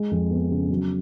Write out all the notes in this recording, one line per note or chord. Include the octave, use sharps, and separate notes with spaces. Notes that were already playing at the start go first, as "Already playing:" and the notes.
Already playing: G#3
F2
B3
C#3
F#3